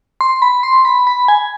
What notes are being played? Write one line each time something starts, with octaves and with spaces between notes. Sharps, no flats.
C6
B5
C6
B5
B5
G#5